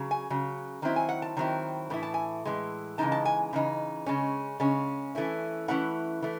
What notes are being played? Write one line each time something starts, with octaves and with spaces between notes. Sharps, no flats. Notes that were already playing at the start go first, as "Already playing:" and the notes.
Already playing: C#3 F#3
G#5
C#3 F#3
D#3 F#3 C4 E4
G#5
F#5
A5
D#3 F#3 C4 E4
A2 E3 E4
A5
G#5
A2 E3 G#3
C#3 E3 G#3 D#4 A5
A5
G#5
C#3 E3 D#4
C#3 G#3 C#4
C#3 G#3 C#4
E3 A3 C#4 E4
E3 A3 C#4 E4 F#5
E3 A3